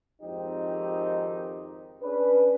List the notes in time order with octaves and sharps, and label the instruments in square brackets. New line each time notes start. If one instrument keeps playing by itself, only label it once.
[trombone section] G#1 F2 D#3 C4 D#4 G4
C#4 D4 G#4 B4